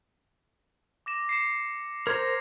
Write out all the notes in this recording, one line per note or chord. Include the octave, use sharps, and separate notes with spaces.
D6 A#6 E7
C7 C#7 E7
A#4 C5 A#5 G#6